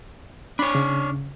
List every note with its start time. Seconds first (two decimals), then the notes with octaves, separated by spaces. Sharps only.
0.59 D4 C#5 B5
0.75 C#3